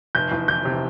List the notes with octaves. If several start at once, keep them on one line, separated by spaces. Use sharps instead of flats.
F1 G6
E2
E3 G6
C3